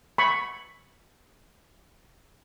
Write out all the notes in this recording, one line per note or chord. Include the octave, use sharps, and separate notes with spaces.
B5 C#6